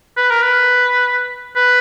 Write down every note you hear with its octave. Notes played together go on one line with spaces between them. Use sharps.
B4
A#4
B4
B4